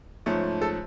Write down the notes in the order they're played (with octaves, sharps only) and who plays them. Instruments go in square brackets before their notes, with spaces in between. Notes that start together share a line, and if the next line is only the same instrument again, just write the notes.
[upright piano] G#2 F3 A3 C#4
A4